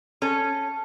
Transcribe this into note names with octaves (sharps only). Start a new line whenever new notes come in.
C#4 A4